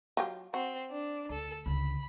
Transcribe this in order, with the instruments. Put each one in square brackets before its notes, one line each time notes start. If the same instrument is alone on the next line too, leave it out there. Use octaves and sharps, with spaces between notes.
[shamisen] F#3 F4 G4
[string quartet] C4 [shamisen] F#4
[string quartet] D4
[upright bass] D2 [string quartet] A4
[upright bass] C#2 D3 [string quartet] B5